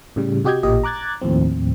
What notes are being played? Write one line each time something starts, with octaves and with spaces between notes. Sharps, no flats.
A2 C#3 G3
C3 F#4 G4 D#5 G6 G#6
A1 A#2 G4 D#5
A#5 D6 F#6 G#6 A6
D#2 A2 F3 C4